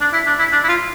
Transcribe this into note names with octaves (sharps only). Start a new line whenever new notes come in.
D4
E4
D4
E4
D4
E4
F4